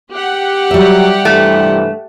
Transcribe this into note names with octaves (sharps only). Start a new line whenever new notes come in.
G4 F#5
F#3 G3 E5
G2 C3 E3 A3